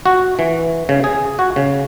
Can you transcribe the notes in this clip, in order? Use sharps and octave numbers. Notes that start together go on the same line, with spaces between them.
F#4
E3
C#3
G#4
F#4
C#3